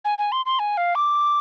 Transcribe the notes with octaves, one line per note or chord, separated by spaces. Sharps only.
G#5
G#5
C6
C6
G#5
F5
D6